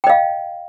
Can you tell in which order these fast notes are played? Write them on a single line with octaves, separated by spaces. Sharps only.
G5 D#5 F5